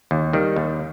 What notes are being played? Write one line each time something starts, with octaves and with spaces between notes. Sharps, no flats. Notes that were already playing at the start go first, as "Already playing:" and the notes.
D#2
D#3 G3
D#2